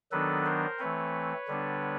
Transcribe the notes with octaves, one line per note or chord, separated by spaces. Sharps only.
D#3 F#3 B3 D4 A4 B4
A#4 C5
E3 A3 C4 B4 C#5
D3 G3 B3 D4